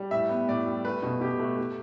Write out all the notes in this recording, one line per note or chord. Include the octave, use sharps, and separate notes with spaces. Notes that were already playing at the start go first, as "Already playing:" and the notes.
Already playing: G3
A2 E5
B3
A2 D5
G3
A3 B4
B2
B2 G4
A3
A3